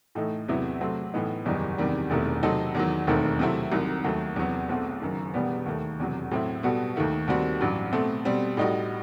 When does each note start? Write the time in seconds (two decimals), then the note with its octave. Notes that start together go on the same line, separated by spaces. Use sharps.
0.15 A2 E3 A3 D#4
0.48 E2 C3 F#3 B3 E4
0.80 C3 F#3 A3 C4
1.13 A2 E3 B3 D#4
1.46 F#1 E2 D#3 G3 D#4
1.78 E2 C3 D#3 G3
2.10 E1 E2 C3 D#3 A3
2.43 C3 F#3 C4 D#4 A4
2.75 E2 D#3 F#3
3.07 E1 D#2 D#3 A3 C4
3.39 C3 F#3 A3 C4 E4
3.71 C2 C3 D#3 F#3
4.04 D#2 D#3 F#3 A3
4.36 E2 C3 F#3 B3 F#4
4.69 B1 B2 A3 C4
5.01 F#1 F#2 D#3
5.34 E1 E2 B2 G3 B3
5.66 D#2 D#3 A3
5.99 E1 E2 C3 F#3
6.31 A2 F#3 C4 E4
6.63 B2 G3 B3 F#4 A4
6.96 D#2 D#3 A3
7.28 D#2 D#3 G3 C4 F#4
7.61 A1 G2 F#3
7.92 B2 A3 C4
8.25 B2 G3 C4
8.57 A2 G3 D#4 F#4